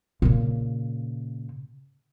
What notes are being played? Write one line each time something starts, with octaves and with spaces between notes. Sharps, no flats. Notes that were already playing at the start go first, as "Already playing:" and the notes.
A#2 C#3